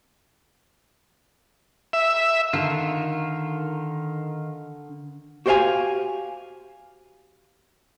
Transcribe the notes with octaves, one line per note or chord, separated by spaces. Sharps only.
E5
D3 D#3 F4
F#4 G4 C5 D5 F5 G#5